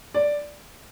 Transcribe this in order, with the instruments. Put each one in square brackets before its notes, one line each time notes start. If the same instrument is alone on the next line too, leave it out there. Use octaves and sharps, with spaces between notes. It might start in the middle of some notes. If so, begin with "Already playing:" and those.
[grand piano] D5